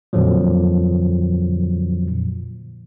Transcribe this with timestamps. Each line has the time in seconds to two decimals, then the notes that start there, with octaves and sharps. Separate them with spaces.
0.13 F2 A#2 D3 F3 F#3